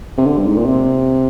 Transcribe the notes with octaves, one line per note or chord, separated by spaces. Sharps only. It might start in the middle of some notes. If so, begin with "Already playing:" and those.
C3
D3
G2
G#2
A#2
C3